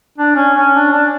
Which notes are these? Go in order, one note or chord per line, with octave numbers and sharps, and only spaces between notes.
D4
C#4
C#4
D4
D4